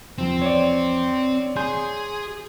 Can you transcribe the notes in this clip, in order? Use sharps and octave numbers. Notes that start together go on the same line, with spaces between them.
E2 F3 C4
C#5 D5
G#4 G#5 C6 G6